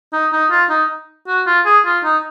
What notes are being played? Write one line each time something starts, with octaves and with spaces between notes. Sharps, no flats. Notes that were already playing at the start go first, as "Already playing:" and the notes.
D#4
D#4
F4
D#4
F#4
F4
G#4
F4
D#4